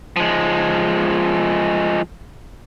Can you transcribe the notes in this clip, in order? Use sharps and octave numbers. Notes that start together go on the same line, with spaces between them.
F3 G#3